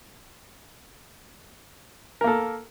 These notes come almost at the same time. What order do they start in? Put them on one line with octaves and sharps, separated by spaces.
A#4 A#3 A4